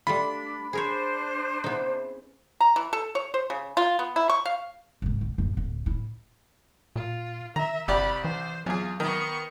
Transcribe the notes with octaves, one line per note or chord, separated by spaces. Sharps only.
G3 A3 D4 F4 B5
D4 G#4 A#4 C5 C#5
C#3 B3 C4 D#4 E4
A#5
E3
A4
C#5
C5
C#3
F4
B3
E4
C#6
F5
G#2 C3
B1
A1 F#2
D1
A2 E4
A#2 F4
D#3 E5 A#5
G1 C2 G4 D5 B5
E3 C5
E2 F#3 F4 G#4
D#3 B3 C#6